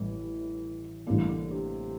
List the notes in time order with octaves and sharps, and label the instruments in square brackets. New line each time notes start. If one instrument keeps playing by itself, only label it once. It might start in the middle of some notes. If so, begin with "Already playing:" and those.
Already playing: [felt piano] A1 A2 G3 [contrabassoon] E3
[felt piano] A1 A2 G3 A#3 D4 [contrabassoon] D3
[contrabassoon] D3
C3